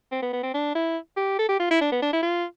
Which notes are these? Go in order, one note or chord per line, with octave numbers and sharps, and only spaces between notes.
C4
B3
B3
C4
D4
E4
G4
A4
G4
F4
E4
D4
B3
D4
E4
F4